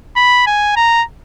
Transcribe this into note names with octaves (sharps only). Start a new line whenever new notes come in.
B5
G#5
A#5